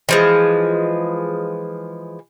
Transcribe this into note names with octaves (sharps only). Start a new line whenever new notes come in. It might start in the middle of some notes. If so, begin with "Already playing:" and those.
E3 F3 G#3